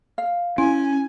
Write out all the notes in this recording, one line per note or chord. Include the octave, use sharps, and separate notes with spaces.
F5
C#4 E4 G#5